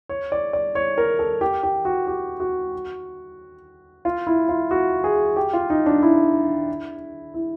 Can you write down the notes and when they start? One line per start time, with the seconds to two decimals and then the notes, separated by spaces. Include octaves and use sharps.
0.09 C#5
0.32 D5
0.53 D5
0.75 C#5
0.98 A#4
1.19 A4
1.41 G4
1.63 G4
1.85 F#4
2.07 G4
2.40 F#4
4.05 F4
4.27 E4
4.49 F4
4.71 F#4
5.04 G#4
5.36 G4
5.53 F4
5.70 D#4
5.86 D4
6.02 E4
7.34 E4